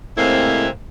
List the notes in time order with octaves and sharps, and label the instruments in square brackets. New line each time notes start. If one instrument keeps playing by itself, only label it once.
[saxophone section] A2 C3 G#3 A#3 C4 E4